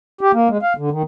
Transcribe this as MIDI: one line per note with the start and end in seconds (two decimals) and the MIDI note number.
0.21 0.32 67
0.34 0.48 58
0.49 0.58 56
0.62 0.73 77
0.77 0.90 50
0.91 1.02 51